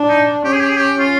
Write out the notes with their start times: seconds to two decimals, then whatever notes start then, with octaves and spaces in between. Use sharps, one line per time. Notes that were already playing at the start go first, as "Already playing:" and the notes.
Already playing: D4
0.09 D#4
0.45 C#4 G4
0.53 G#4
0.61 G4
0.69 G#4
0.77 G4
0.99 F4